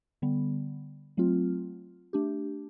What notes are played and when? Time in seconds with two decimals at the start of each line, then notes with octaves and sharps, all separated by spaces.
0.22 D3 G3 B3
1.17 F#3 A3 C4 F4
2.13 A3 D4 G4